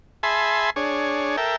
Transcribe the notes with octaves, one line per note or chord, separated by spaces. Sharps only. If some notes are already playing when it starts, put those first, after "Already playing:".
G#4 E5 G#5 A5 B5 C6
D4 G#4 C#5
A4 A#4 E5 G5